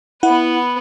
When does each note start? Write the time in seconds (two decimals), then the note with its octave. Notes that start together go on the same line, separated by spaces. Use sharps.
0.23 B3 E4 B4 F#5